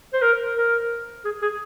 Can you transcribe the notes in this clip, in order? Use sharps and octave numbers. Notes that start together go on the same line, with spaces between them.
C5
A#4
A#4
G#4
G#4